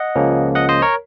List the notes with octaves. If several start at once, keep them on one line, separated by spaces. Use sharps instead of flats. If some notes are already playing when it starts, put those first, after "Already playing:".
Already playing: D#5 F#5
C#2 C#3 F3 A#3 C#4
D#5 F#5
C5 D#5
A#4 C#5